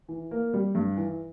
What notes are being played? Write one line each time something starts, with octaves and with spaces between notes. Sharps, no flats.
E3
A#3
G3
G2
E3